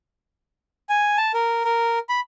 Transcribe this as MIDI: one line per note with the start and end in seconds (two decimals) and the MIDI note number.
0.89 1.17 80
1.17 1.32 81
1.34 1.64 70
1.65 1.99 70
2.09 2.20 83